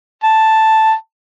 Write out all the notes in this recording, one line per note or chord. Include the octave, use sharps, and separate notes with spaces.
A5